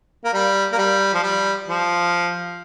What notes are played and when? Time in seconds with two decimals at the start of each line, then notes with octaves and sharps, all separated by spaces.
0.25 A#3
0.33 G3
0.72 A#3
0.78 G3
1.14 F3
1.23 G3
1.69 F3